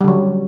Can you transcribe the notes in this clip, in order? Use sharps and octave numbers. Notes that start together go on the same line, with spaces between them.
D3 F#3 G3